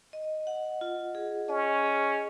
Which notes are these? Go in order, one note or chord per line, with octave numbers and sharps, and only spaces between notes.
D#5
F#5
F4
G#4
C#4 D#5
G#4